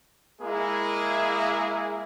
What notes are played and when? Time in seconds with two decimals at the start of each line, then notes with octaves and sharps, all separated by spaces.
0.42 G#3 A#3 E4 G#4